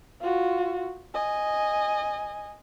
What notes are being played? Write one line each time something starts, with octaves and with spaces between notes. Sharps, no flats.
F4 F#4
D#5 G#5